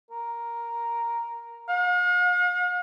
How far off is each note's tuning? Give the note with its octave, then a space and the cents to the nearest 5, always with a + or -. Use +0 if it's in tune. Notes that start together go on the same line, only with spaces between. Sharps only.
A#4 +5
F5 +45